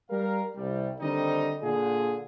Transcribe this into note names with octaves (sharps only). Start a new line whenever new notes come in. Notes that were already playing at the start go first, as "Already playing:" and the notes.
G3 A#4 F5
C2 G3
D3 D#3 G3 C4 D#4 D#5
A#2 D3 F4 G#4